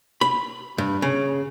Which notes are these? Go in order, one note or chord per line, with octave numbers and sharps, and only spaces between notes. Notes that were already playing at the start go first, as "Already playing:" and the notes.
B5
G2
C#3